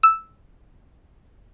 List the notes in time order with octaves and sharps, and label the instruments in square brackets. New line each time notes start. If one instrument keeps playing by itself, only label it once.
[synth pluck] E6